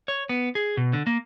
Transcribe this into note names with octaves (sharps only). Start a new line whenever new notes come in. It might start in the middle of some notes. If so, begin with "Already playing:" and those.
C#5
B3
G#4
B2
D3
A#3